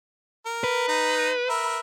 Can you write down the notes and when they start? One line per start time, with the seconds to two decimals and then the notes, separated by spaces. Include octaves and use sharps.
0.46 A#4
0.64 B4
0.88 D#4
1.49 A#4 B4 E5